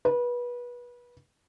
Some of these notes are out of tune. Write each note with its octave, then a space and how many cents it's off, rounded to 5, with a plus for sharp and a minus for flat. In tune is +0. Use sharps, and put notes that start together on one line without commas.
B4 -25